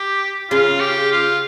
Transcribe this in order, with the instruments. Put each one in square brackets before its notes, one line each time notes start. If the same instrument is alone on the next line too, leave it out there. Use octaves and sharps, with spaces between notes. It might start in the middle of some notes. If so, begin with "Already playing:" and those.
Already playing: [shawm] G4
[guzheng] C#3 [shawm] F4
[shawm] G4
F4